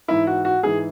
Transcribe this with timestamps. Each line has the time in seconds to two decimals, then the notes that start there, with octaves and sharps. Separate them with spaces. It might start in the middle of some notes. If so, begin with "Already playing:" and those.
0.08 G#2 E3 E4
0.27 F#4
0.45 F#4
0.63 G#2 E3 G#4